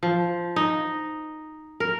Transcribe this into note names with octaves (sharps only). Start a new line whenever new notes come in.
F3
D#4
A#4